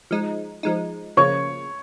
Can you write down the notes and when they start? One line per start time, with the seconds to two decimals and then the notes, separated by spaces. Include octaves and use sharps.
0.11 F3 G#3 D#4
0.63 F3 G#3 D#4
1.17 C#3 F3 A#3 C#5 C#6